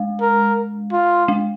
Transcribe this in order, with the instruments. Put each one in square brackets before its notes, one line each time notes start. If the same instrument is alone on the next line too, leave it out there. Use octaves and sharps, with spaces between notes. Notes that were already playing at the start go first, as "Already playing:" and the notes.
Already playing: [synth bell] G#3
[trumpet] A#4
F4
[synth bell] G#3